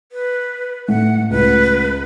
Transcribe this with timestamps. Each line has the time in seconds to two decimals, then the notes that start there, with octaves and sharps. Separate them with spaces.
0.12 B4
0.88 A2 A3 F#5
1.30 C#2 B4